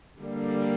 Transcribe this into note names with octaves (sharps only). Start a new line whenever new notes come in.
D3 G3 A#3